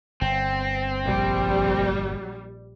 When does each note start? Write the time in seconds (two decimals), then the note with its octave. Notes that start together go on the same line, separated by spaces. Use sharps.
0.21 G1 C4
1.03 A#1 G3